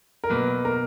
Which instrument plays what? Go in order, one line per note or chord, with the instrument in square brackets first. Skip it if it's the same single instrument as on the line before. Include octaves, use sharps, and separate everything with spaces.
[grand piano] A#4
[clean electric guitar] B2 F#3 A#3 [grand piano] B4
[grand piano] A#4